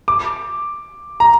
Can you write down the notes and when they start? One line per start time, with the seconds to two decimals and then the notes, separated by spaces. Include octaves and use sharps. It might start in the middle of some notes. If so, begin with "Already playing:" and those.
0.08 D6
1.20 A#5